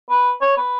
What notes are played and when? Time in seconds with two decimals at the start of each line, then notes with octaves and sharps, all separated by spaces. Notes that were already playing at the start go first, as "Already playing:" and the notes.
0.10 B4
0.41 C#5
0.57 B4